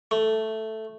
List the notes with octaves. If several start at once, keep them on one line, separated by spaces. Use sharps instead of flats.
A3